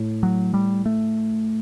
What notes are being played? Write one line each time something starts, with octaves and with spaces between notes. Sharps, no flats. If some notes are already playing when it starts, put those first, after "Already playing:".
Already playing: A2
F#3
G3
A3